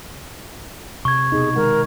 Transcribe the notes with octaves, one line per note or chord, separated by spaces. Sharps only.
C3 C#6 G#6
B2 D#4 G#4
D#3 G#3 A#4 F#5